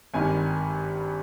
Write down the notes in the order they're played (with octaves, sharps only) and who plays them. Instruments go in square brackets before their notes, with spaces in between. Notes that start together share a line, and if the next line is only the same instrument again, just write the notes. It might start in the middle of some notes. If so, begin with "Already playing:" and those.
[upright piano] G#1 G2 D#3 G#5